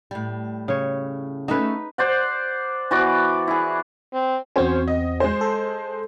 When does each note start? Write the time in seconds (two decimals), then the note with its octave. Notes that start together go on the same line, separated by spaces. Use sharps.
0.11 A2 G3
0.68 C#3 C#5
1.48 A3 C#4 D#4 F#4 B4
1.98 C5 D5 F#5
2.91 E3 B3 F#4 D5
3.48 E4 G#4
4.13 C4
4.56 E2 C4 C#4 F#4 C5
4.88 D#5
5.20 G#3 C5
5.41 A4